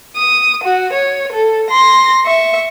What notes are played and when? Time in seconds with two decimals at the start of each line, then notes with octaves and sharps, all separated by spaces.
0.16 D#6
0.64 F#4
0.93 C#5
1.32 A4
1.70 C6 A#6
2.25 E5 C#6